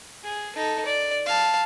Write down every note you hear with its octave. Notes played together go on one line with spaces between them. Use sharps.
G#4
D#4 A4
D5
F5 A5